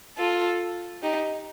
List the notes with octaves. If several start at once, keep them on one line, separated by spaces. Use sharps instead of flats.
F4 A4
D#4 G4